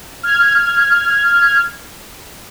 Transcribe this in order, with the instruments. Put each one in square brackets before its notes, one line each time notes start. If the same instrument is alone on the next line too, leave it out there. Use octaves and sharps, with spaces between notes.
[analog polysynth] F6 G#6